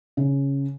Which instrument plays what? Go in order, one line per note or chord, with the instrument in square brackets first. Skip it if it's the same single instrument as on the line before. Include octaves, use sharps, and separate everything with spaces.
[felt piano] C#3